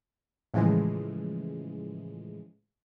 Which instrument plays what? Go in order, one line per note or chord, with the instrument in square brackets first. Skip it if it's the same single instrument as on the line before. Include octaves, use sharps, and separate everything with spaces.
[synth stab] A2 C#3 E3 F3 G#3